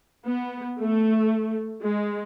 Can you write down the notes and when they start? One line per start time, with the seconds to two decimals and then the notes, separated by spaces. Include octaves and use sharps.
0.24 B3
0.78 A3
1.83 G#3